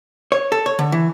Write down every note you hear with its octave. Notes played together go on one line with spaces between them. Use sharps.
C#5
A4
C#5
D3
E3